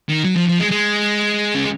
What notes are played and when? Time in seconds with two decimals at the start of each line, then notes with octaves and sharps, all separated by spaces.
0.09 D#3
0.24 F#3
0.36 F3
0.48 F3
0.59 G#3
0.71 G#3
1.55 C#4